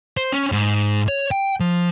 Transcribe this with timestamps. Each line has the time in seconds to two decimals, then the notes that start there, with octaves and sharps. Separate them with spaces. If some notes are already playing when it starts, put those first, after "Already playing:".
0.17 C5
0.32 C#4
0.52 G#2
1.08 C#5
1.31 G5
1.60 F3